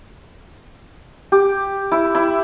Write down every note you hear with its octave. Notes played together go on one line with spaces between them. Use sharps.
G4
E4
E4